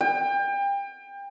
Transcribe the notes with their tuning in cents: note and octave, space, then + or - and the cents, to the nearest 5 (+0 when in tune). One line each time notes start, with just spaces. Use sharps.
G5 +30